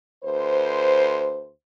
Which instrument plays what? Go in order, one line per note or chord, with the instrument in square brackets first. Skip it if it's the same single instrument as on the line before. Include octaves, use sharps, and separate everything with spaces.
[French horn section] D2 B4 C5